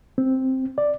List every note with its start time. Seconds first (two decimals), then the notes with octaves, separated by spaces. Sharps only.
0.18 C4
0.78 D5